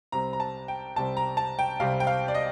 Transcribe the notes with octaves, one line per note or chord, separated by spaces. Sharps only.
C2 C3 G3 C4 A#5
A#5
A5
G5
C2 C3 G3 C4 A5
A#5
A5
G5
C2 C3 G3 C4 F5
G5
F5
D5
D#5